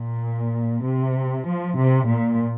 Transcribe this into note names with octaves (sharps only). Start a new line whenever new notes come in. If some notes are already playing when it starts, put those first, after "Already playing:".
Already playing: A#2
C3
F3
C3
A#2